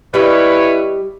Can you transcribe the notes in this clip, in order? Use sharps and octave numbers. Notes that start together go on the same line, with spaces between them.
G3 E4 B4 C#5 D#5